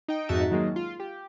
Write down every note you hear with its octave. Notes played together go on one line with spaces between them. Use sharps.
D#4 G5
F2 G#2 D#4 F#4 E5 A5
D#3 F#3 G#3 A#3
F4
G4